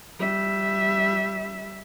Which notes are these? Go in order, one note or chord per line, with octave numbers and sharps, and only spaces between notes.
G3 E5